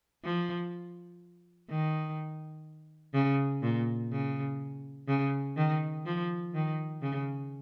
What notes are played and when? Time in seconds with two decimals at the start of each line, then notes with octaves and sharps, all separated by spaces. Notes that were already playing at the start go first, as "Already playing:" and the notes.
0.24 F3
1.70 D#3
3.14 C#3
3.62 A#2
4.12 C#3
5.08 C#3
5.57 D#3
6.06 F3
6.55 D#3
7.02 C#3